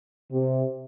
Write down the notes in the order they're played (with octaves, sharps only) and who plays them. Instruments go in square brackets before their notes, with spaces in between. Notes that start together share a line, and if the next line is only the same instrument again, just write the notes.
[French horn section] C3